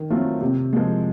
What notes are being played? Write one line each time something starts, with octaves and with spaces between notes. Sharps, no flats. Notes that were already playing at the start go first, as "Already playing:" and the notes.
Already playing: D#3
F#3 A3 C4 F4
C3
F3 G#3